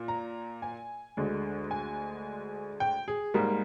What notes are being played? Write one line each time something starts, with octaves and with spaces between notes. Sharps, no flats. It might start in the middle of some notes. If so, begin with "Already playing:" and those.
Already playing: A#2
A#5
G#5
D2 D3 G#3
G#5
G5
G#4
G#2 G3 A#3 A#4